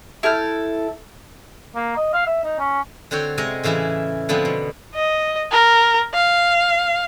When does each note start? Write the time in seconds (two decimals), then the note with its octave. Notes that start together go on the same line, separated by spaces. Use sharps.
0.23 E4 A4 F6 G6
1.76 A#3
1.97 D#5
2.14 F5
2.27 E5
2.44 D#4
2.59 C#4
3.11 D3 C4 F#4 C#5 G5
3.38 C3 G#3 D#5 G#5 A#5
3.63 A2 C#3 E3 E4 G#4
4.29 D3 F3 B3 C4
4.45 B2
4.95 D#5
5.51 A#4
6.14 F5